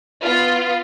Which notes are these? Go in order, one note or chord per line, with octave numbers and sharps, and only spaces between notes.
B3 F4